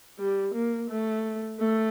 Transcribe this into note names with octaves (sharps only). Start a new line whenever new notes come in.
G3
A#3
A3
A3